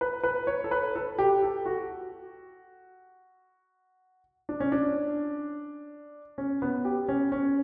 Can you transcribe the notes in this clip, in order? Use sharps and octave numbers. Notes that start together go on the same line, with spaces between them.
B4
B4
C#5
A4
B4
A4
G4
A4
F#4
D4
C#4
D4
C#4
B3
G4
C#4
C#4